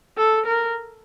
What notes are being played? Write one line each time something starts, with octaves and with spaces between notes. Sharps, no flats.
A4
A#4